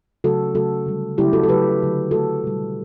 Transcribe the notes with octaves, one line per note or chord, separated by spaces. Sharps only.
C#3 F#3 A3 F#4 A4
C#3 F#3 A3 F#4 A4
D3 G3
C#3 F#3 A3 E4 G4
F#4 A4
A4
C#3 F#3 A3 G4 B4
D3 F#3 A3
C#3 F#3 A3 F#4 A4
B2 G3